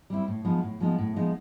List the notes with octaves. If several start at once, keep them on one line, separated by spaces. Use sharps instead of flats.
G3 C4 E4
A2
F3 G#3 B3 D#4
A2
F3 G#3 B3 D#4
A2
F3 G#3 B3 D#4